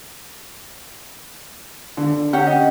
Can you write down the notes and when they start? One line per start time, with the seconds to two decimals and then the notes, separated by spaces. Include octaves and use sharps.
1.97 D3
2.33 C#4 G4 F#5
2.47 D#5